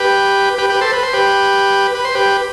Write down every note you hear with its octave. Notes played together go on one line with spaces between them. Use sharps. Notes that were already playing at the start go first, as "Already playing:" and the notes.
Already playing: G4 B4
G4 B4
G4 B4
A4 C5
B4
C5
G4 B4
B4
C5
G4 B4